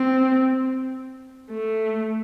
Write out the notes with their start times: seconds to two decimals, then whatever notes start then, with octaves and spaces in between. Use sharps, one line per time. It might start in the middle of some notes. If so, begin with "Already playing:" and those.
Already playing: C4
1.51 A3